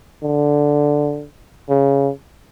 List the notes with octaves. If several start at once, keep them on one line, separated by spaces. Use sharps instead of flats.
D3
C#3